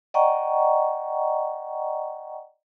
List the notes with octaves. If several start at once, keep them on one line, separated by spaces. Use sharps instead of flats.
D5 D#5 F#5 G5 A#5 C#6